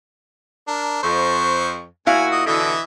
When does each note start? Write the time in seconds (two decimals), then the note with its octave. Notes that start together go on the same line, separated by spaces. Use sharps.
0.68 D4 A#4
1.03 F2 C5 C#6
2.07 A#2 E4 F#4 F5 G#5
2.31 D#5
2.46 B2 D3 E3 D#5 E5